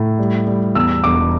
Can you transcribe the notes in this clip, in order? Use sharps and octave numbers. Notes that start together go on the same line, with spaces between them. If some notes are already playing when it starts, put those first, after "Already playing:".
Already playing: A2
G3
G3
E2 E6
E1 D6